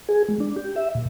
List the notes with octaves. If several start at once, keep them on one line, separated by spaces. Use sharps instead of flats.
G#4
G#3
D4
G4
E5
A#2